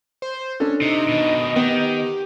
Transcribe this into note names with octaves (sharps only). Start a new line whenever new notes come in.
C5
C#4 D4 A4
C3 D#4 D#5
B2 D#3
D#3 B3 G4